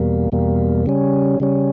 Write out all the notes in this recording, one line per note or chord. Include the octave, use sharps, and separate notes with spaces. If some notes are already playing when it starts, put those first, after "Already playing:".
Already playing: E2 B2 G3 A#3
E2 B2 G3 A#3
C#3 G3 C#4
C#3 G3 C#4